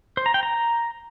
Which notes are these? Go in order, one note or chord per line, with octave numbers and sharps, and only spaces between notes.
C5
A#5
G5
A#5